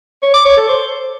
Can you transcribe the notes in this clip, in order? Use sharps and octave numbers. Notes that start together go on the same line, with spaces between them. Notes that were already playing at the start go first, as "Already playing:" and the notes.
C#5
D6
C#5
A4
C5